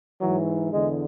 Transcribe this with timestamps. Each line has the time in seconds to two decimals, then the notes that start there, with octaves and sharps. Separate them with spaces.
0.20 G#2 E3 F#3
0.72 E2 D3 G#3